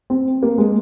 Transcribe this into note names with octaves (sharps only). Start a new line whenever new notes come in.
C4
A#3
G#3